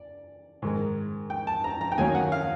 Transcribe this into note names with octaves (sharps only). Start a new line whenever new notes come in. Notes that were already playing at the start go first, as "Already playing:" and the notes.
Already playing: D5
G#2 D#3 G#3
G5
A5
A#5
A#5
G5
D#2 D#3 F#3 A#3 C#4 G#5
F#5
F5